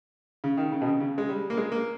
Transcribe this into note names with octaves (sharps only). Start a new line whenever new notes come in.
C#3
D#3
C#3
B2
C#3
C#3
G#3
G3
A#3
G#3
A#3